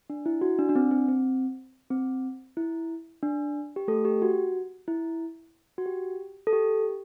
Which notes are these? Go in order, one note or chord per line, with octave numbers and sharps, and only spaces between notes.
D4
E4
F#4
D4
D4
C4
C4
C4
C4
E4
D4
G4
A3 A4
G4
F#4
E4
F#4
G4
A4
G4